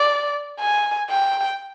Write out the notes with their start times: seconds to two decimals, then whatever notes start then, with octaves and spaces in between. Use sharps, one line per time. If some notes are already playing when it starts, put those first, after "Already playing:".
Already playing: D5
0.60 G#5
1.10 G5